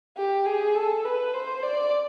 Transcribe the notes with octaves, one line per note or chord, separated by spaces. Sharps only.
G4
G#4
A4
B4
C5
D5